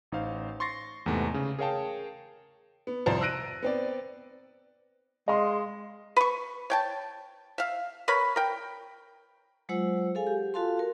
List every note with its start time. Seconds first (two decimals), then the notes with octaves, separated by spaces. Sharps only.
0.12 A1 D#4 C5 F5
0.60 C6 C#6 A6 A#6 C7
1.06 E2 G#2 C3 A3 B3
1.34 C#3
1.59 G#4 A#4 C#5 F5 G5 A5
2.87 B3
3.06 C2 F2 C5 D5 A#5 A6
3.21 E6 F#6 A#6 D7 D#7
3.62 B3 C4 D5
5.28 G#3 D#5 F5 C6
6.16 B4 C#6
6.70 C#5 G5 A5
7.58 E5 F5
8.08 A#4 B4 C#5 B5
8.36 A#4 G5
9.69 F#3 G#3 F4 C5 F#5 E6
10.15 G#4 A4 F5 G#5
10.27 G4
10.54 F4 F#4 A4 F5 A5 C6
10.77 F#4 A#4